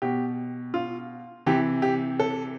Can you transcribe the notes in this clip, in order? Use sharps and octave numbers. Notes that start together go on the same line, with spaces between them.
B2 G4
F4
C3 E3 G4
G4
A4